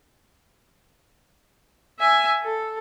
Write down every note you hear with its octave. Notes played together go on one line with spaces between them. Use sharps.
E5 G#5
A4